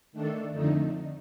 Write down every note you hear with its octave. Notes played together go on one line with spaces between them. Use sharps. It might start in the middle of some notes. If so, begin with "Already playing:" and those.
D#3 A3 D4 A4
F2 D3 A3 D#4